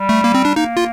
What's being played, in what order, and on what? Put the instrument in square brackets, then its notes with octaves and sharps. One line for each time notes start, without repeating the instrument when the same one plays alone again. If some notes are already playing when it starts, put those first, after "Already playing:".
Already playing: [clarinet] G3
[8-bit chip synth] A3
A#3
C4
D4
[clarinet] A#3 [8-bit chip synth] D#4
[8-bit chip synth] F4